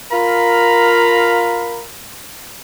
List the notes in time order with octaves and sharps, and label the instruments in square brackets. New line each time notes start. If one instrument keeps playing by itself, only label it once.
[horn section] F4 A#4 F5 A#5 B5